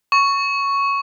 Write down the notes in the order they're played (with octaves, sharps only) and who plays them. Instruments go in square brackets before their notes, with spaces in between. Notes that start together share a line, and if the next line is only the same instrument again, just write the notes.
[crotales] C#6